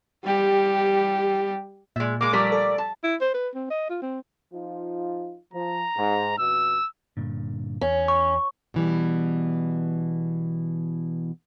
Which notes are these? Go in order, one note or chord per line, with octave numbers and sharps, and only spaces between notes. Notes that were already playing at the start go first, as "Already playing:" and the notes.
G3 G4
A#2 G#3 E5
G#3 A#3 D6
A#2 F3 G3 A3 A#4 D5 B6
A4
A5
E4
C5
B4
C4
D#5
F4
C4
F3 D#4 F4
F3 A#5
G#2
F2 B2 E6
G2 A#2 D3
E2 C#4
C#6
B2 E3 G3